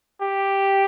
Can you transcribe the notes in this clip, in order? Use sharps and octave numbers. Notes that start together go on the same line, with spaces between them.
G4